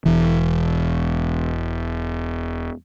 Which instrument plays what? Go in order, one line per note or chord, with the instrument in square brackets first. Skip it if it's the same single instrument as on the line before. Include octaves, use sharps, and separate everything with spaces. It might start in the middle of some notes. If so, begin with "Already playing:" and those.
[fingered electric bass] E1 E3